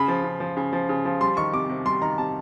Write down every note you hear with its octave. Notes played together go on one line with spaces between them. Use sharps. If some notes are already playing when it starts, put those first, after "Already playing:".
Already playing: C#3 B5
F3
C#3
F3
C#3
F3
C#3
F3
G3 C6
D#3 C#6
C3 D6
C3
G3 C6
D#3 A#5
C3 A5